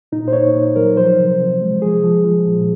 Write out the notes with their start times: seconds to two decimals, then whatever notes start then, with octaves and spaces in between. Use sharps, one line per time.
0.12 A#2 D#4
0.28 C5
0.33 A#2 C#5
0.55 A#2
0.76 F#3 A#4
0.97 F3 C5
1.19 C3
1.40 C3
1.61 G#3
1.82 F3 G#4
2.03 F3
2.25 F3
2.46 A#2